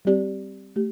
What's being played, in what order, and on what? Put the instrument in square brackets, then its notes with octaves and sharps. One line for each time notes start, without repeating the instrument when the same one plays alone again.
[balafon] G3 C4 G4 D5
A3 G4